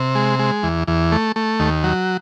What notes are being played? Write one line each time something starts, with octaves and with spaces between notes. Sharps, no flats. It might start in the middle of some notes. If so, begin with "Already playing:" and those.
Already playing: C3
G#3
G#3
E2
E2
A3
A3
D#2
F#3